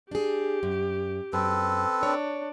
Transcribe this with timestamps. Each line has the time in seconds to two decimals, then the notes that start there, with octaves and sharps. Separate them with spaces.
0.11 D4 G4 G#4
0.63 F#2
1.33 F#2 C4 A4 B4
2.03 D4 C#5